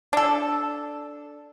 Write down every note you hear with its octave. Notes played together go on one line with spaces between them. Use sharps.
D4 A4